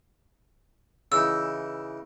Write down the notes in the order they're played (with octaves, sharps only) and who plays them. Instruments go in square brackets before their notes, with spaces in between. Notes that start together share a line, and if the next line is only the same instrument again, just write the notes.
[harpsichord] C#3 E3 D#4 [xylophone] E6